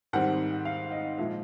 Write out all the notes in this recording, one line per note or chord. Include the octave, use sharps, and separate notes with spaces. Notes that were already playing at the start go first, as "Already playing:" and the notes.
G#2 D#3 G3 C4 F#5
F5
D#5
A#2 F3 G#3 E5